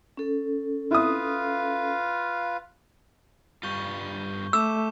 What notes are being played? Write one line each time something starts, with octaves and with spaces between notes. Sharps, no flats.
C#4 A4
E4 F4 B4 F5 D#6
G2 G3 F4 C#6 G6 G7
A3 D6 E6 G6 E7